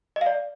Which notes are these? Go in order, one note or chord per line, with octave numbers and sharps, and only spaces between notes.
D#5
F5
D5